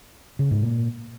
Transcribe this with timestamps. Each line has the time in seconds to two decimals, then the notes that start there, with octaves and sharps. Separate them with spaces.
0.39 C#3
0.51 G#2
0.62 A#2